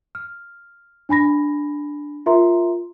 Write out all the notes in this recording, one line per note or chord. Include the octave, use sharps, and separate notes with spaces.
F6
D4 G#5 B5 A#6
F4 A#4 E5 A#5 C6